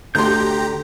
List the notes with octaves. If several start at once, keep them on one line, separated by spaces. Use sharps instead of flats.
D2 D3 G4 A#5 C6 G6